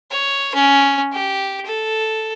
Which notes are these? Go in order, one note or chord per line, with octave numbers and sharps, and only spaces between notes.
C#5
C#4
G4
A4